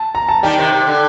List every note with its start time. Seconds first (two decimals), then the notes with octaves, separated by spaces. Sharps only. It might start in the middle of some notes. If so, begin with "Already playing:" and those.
Already playing: A5
0.15 A#5
0.29 A5
0.43 D#3 G3 G5
0.58 C3 D#3
0.72 C3
0.87 D3